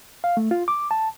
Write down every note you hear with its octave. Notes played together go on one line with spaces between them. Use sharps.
F5
A3
F4
D6
A5